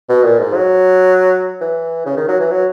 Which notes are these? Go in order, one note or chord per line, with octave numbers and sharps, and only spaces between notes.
B2
A#2
G#2
F#3
E3
C#3
D#3
F#3
E3
F#3